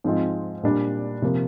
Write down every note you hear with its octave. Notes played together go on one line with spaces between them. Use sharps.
G#2 F3 G#3 C4 F4
A#2 G3 D4
C3 F3 A#3